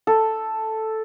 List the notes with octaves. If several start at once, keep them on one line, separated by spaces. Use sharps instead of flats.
A4